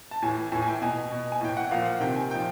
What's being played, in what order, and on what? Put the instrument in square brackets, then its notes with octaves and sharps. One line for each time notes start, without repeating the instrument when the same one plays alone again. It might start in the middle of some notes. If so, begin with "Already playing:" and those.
[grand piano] A5
A2 E3 G#5
A2 E3 G#5
G#5
G5
B2 G#5
B2
G#5
A2 E3 G5
F#5
A#2 F3 F5
F#5
C3 D#3 G5
G#5
A#2 F3 G5